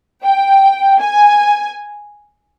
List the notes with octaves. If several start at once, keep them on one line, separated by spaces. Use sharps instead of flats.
G5
G#5